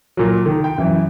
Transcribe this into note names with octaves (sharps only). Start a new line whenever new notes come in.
A#2 F#3
D#3
G5
F#2 E3